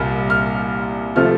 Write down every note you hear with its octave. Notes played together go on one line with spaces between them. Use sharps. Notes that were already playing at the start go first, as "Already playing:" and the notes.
Already playing: C2 A#2 G3 A#3 F6
F6
C3 F3 A3 F6